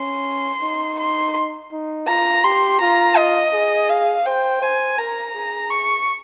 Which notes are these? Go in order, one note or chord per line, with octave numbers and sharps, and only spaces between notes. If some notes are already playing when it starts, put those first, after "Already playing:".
Already playing: C#4 C6
D#4
C6
D#4
F4 A#5
G4 C6
F4 A#5
D#5
G#4
F5
C5 G5
C5 G#5
A#4 A#5
G#4
C#6